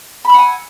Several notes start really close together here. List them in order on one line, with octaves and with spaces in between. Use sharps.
B5 E6 F#5 G#5